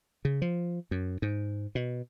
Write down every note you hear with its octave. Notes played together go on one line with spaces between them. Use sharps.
C#3
F3
F#2
G#2
B2